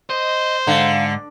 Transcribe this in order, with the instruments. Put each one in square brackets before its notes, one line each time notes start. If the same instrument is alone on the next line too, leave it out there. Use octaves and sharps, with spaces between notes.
[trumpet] C5 [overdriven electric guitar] D#5
[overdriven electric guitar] G#2 [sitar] D3 [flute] F5